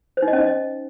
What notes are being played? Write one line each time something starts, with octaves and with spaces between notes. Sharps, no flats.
C5
D#4
D#5
C#4
D#5